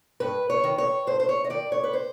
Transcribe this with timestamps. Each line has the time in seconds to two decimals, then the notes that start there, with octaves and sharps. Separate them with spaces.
0.20 G2 B4
0.50 C#5
0.64 D#3
0.78 C#5
1.07 G2 C5
1.20 C5
1.29 C#5
1.45 D#5
1.50 D#3 D5
1.72 C#5
1.83 B4
1.93 C5